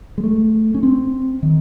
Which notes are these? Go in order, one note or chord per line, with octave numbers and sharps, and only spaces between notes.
G#3
A3
C#4
C4
D#3